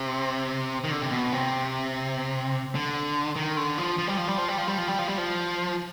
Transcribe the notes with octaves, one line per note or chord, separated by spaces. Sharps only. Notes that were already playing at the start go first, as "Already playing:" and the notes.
Already playing: C3
D#3
D3
C3
B2
C3
D3
D#3
D3
F3
F3
G3
F3
G3
F3
G3
F3
G3
F3
G3
F3
G3
F3